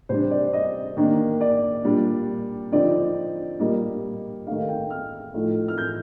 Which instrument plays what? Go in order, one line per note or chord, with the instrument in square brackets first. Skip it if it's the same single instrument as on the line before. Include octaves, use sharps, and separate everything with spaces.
[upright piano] C3 G3 D4 C5
D5
D#5
D#3 A#3 D4
D5
A#2 G3 D4
D3 F3 C4 D#4 D5
A#2 G3 A#3 D#5
D#3 A3 D#4 F5
G5
F6
A2 F3 A3 D#4
F6
G6